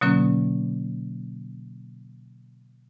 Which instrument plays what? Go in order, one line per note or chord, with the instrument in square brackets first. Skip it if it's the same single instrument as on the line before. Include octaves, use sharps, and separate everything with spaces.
[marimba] B2 D3 F#3 A#3 C#4